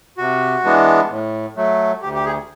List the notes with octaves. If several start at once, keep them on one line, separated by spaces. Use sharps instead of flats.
C3 F#4
E3 G#3 B3 D4
A2
F#3 A3
D2 G4
G4
G#4